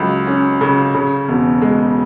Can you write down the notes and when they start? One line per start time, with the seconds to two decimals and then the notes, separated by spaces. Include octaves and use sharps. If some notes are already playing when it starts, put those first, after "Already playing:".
Already playing: C#2 F#3
0.27 C#4
0.61 C#3
0.95 C#3
1.28 E1
1.62 G#3